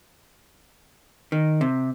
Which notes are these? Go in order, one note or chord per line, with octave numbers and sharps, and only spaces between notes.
D#3
C3